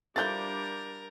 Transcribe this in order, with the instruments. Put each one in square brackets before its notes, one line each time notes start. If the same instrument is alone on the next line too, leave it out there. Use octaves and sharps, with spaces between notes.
[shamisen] D3 F3 E4 [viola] G3 D4 [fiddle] A#4 [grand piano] G6 A6